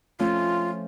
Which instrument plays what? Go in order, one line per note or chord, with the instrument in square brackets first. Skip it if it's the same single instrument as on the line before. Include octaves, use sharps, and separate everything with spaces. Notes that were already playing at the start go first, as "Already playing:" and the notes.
[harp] F3 A3 C#4 [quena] F4